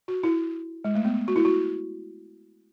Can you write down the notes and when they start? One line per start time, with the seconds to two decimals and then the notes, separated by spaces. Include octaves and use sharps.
0.08 F#4
0.23 E4
0.84 G#3
0.95 A3
1.05 B3
1.28 F#4
1.36 E4
1.45 F#4